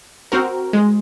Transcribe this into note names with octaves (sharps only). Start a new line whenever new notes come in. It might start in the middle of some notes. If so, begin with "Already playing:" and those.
C4 F#4 A#4
G#3